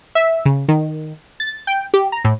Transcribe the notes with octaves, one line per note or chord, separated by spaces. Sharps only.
E5
C#3
D#3
A6
G5
G4
A#5
A2